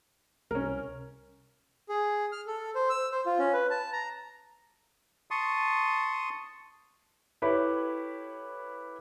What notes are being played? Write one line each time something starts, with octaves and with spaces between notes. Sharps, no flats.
C2 C#4 A#4
G#4
F6
A4
C5
E6
C5
F4
C#4
B4
A5
A#5
A5 C6 C#6 D#6
E4 G4 A4 B4 C#5 B5